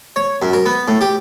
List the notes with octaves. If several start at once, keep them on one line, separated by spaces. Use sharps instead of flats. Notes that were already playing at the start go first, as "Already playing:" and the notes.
C#5
F#2
A#4
B3
A2
G4